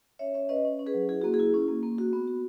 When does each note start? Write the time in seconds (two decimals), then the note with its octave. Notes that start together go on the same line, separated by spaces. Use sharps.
0.19 C#4 C#5 E5
0.34 C#4 C#5 E5
0.49 C#4 B4 D#5
0.65 C#4
0.79 C#4
0.86 G#4 B4
0.94 F#3
1.09 E4 G#4
1.21 A#3 F#4
1.34 G#4
1.39 E4
1.54 C#4
1.68 A#3
1.83 A#3
1.98 F#4
2.13 B3
2.28 F#4